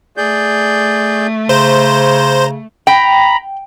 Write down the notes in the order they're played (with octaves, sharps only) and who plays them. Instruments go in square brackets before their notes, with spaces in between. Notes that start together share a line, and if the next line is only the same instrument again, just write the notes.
[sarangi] A3 [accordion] G#4 D5 G6
[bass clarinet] C#3 [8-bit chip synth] C5 [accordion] A#5
[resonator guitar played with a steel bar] G5 [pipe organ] A#5 B5